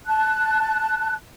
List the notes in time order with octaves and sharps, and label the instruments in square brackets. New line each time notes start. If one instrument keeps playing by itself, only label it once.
[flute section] A5 F#6